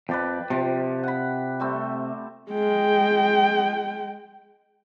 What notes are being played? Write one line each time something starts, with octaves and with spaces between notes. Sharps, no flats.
F2 B4 D5 G5
C3 F3
F#5 B5
G3 A3 C4
G#3 G5